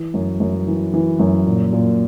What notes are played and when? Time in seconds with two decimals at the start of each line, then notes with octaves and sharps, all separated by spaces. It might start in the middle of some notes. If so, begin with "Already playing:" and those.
Already playing: E3
0.14 F#2
0.40 F#2
0.67 E3
0.94 E3
1.19 F#2
1.46 A#2
1.72 A#2